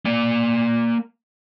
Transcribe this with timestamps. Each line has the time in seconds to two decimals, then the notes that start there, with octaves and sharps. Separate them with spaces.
0.05 A#3 D5